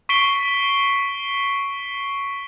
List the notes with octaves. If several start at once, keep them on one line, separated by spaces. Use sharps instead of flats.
C#6 B6 C7 D7 G7